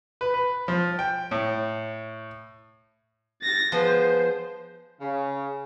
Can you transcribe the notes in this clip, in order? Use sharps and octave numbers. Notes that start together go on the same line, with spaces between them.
B4
B4
F3
G5
A2
A6 A#6
F3 G#3 B3 C5
C#3